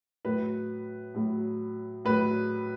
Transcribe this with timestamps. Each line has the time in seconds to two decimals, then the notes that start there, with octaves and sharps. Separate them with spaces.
0.25 A2 F#3 B4
1.15 A2 F#3
2.05 A2 F#3 B4